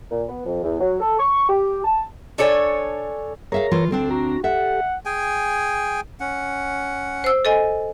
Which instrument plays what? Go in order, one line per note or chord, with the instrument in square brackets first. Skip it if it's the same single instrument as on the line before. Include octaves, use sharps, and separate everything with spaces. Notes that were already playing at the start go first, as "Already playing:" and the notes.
[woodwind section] A#2
B3
F2
E2
F#3
A4
C#6
G4
A5
[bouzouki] D4 A4 C#5 G#5
[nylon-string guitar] G#4 E5 F5 [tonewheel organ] A#4 C#5 A#5
[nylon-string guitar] E3 F4
[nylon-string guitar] D2 C4 D4 [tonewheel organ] A4
[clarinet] F#4 [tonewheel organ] A#5
[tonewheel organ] G4 A4 [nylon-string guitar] E5 [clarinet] F#5
[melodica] G#4 G5 G#5
C#4 F#5
[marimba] C5 E6
A4 D#5 G#5